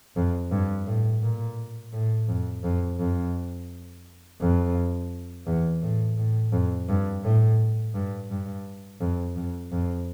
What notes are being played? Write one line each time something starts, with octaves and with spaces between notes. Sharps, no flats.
F2
G2
A2
A#2
A2
F2
F2
F2
F2
E2
A2
A2
F2
G2
A2
G2
G2
F2
F2
F2